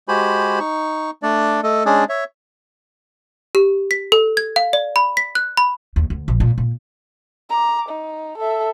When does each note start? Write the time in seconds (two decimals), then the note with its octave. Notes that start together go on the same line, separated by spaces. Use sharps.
0.08 G#3 F#4 G4 C5 G#5 B5
0.60 D#4 C#6
1.23 A3 D4 D5
1.63 A3 A4 D#5
1.86 G#3 C#4 D4 G#4 D5
2.09 C#5 E5
3.55 G4
3.91 B6
4.12 A4
4.37 G#6
4.56 F5
4.73 D5
4.96 B5
5.17 B6
5.35 F#6
5.57 B5
5.96 D#2
6.10 D2
6.28 A#1
6.40 A#2
6.58 A#2
7.49 A#5 D6
7.89 D#4
8.38 A4 E5